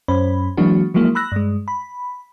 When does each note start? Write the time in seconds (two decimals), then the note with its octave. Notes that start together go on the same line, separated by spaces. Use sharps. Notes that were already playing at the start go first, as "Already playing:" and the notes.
0.08 F#2 C#4 C5 B5
0.57 E3 F#3 G#3 A#3 D4 F#4
0.94 F3 F#3 G#3 A#3 E4
1.15 B5 E6 F#6 A#6
1.32 G2 G#3
1.68 B5